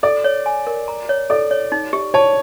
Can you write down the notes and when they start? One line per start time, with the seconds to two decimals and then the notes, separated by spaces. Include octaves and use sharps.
0.03 A4 D5
0.24 C#5
0.46 G#5
0.67 A#4
0.88 A#5
1.09 C#5
1.30 A4 D5
1.51 C#5
1.72 D#4
1.93 G4
2.14 C#5 A5